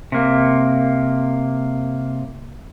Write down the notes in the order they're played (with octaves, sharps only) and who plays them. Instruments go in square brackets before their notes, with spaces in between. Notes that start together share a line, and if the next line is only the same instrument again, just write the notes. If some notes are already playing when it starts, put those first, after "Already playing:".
[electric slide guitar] C3 A#3